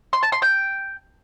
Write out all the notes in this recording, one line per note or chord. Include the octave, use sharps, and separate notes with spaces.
C6
A5
C6
G5